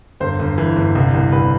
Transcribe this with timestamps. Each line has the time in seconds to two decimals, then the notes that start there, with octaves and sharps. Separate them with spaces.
0.20 G1 C5
0.39 G1
0.58 E3
0.76 G1
0.95 C2
1.14 C2
1.32 C2 B4